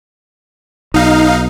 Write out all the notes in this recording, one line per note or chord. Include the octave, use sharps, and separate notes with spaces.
B1 D#4 F5